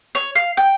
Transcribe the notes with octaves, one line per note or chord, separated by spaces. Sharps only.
C#5
F5
G5